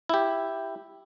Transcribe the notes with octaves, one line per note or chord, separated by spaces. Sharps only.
E4 G4